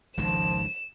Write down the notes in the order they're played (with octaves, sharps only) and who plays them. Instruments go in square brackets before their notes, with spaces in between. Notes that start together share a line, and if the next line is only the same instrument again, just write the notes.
[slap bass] G#1 C#2 D#3 [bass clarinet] F3 [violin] E7